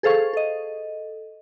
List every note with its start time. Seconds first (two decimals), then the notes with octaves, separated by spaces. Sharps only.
0.03 G#4 A4 C5 F5 C#6
0.33 A4 D#5